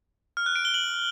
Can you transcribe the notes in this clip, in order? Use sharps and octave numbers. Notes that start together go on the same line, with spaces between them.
F6
F#6
D7
G7
F#7